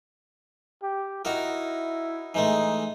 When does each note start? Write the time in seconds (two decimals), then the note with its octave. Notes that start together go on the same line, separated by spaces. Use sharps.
0.83 G4
1.25 D#4 E4 F#4 A#4
2.34 E3 G#3 A3 D#4